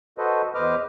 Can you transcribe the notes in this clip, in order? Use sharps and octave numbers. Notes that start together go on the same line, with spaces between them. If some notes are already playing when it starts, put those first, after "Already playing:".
F#4 A4 B4 C5 D#5
E2 B4 C5 D#5 D6 F6